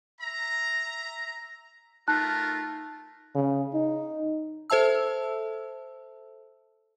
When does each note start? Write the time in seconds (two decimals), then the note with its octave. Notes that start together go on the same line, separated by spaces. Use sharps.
0.21 E5 A#5
2.08 A3 D#4 F4 A#4 A5 F#6
3.35 C#3
3.74 D#4
4.70 A4 C5 E5 A5 E6